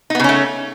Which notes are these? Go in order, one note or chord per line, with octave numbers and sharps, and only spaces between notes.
C#3 A3 B3 C#4 D#4